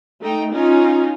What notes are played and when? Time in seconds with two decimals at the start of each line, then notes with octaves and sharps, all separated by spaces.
0.20 A3 D#4 G5
0.53 C#4 D#4 F4